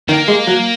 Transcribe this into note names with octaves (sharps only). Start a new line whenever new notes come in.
D#3 A#3
G#3
F#3